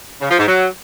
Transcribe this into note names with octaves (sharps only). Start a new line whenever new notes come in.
C#3
F3
G#2
F#3